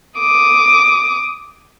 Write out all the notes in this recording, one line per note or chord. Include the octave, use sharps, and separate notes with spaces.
D6 D#6